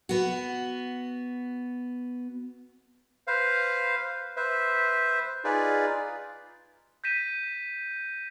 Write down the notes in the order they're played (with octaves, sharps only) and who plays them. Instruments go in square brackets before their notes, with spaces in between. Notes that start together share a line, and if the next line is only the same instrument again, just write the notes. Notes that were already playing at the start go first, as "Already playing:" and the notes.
[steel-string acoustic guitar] B3 F#4
[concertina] B4 C5 F5
B4 C5 E5
D#4 F4 G#4 B4 D5
[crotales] G6 A#6 B6 D#7 E7